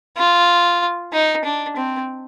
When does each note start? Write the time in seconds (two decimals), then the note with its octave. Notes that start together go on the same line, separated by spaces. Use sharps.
0.17 F4
1.13 D#4
1.45 D4
1.76 C4